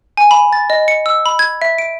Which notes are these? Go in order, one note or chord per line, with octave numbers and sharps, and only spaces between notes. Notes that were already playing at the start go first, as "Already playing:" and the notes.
G#5
B5
A6
D#5
C#7
E6
B5
G#6
E5
D7